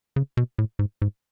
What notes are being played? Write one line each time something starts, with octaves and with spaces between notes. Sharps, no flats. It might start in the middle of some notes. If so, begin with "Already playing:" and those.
C#3
B2
A2
G#2
G#2